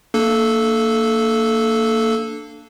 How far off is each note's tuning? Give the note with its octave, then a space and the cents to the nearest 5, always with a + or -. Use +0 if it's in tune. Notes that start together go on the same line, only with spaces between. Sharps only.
A#3 -20 D4 +10 A4 -10